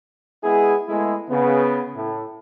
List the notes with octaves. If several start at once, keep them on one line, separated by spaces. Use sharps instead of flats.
G#3 B3 E4 G#4
G#3 A3 B3 E4 G#4
C#3 B3
A2